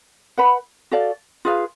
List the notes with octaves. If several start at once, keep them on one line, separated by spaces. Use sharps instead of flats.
B4 F#5 B5
F#4 A4 D5 F5
F4 G#4 B4 F5